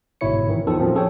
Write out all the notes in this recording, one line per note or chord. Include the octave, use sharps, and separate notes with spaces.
G1 G#2 B2 E4 C#5 C#7
D#3 E3
E2 D#3 F3 A4
A#2 F3 F#3 C4 C#4
G#4 A4 C#5 G5